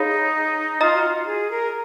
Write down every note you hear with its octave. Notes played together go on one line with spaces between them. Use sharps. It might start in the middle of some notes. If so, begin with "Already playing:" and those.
Already playing: D#4 G#4 C#5 F5 B5
F4 D#5 A#5 D#6
F#4
F4
G#4
A#4